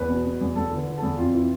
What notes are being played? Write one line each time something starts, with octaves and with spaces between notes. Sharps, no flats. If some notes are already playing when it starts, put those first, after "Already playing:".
Already playing: E2 B4
B2
B2
E2
E2 A4
D3
B4
D3
E2 A4
F2 F4
E3